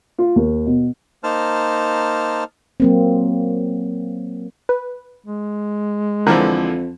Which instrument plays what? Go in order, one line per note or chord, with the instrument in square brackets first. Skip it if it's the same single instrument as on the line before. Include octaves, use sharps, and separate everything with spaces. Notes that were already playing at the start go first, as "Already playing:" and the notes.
[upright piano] F4
D#2
B2
[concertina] A#3 D#4 C5 A5 F6
[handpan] F#3 A#3 C4
[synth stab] B4
[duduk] G#3
[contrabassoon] F2 [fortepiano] D3 E3 F3 [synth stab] A#4